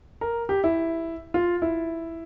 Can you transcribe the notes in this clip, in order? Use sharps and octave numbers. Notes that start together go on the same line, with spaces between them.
A#4
G4
E4
F4
E4